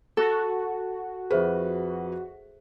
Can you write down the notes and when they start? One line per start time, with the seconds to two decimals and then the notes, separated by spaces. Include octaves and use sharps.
0.17 F#4 A4
1.31 F2 G#4 B4 C5 E5